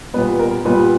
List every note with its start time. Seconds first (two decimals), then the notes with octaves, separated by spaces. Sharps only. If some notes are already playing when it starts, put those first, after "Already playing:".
0.14 A#2 G3 B3 B4
0.39 A#4
0.65 A#2 G3 B3 B4